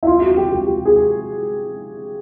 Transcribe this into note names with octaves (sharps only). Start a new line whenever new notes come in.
E4
F4
F#4
G4
G4
G4
G#4